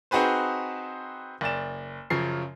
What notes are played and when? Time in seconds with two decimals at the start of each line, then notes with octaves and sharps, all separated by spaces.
0.11 C4 D#4 F#4 G#4 B4 C5
1.41 F#1 D5 E7
2.10 F#2 C#3 F3 C7